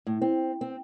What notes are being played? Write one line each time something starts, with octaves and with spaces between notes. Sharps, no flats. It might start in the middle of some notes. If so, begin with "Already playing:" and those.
A2
C4
C4